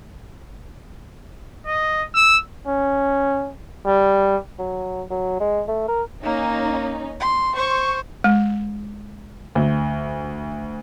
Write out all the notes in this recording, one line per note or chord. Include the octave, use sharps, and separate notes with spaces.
D#5
E6
C#4
G3
F#3
F#3
G#3
A3
A#4
A#3 C#4 D#4
C6
C5 C#6
G#3
D2